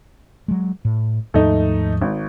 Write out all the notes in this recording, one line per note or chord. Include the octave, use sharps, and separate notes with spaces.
F#3 G#3
A2
D#2 G#2 F3 A3 D#4
G#1